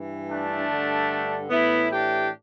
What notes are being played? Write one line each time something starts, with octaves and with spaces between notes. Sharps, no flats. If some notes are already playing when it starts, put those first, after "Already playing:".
Already playing: G2 E3
A3 D4
G2 D3
A2 E3 B3 E4
D4 G4